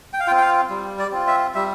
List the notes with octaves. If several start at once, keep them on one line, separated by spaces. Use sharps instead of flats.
G5
F5
C4 F4 G5
G5
F5
G3
D5
C4 F4
E5
G3 E5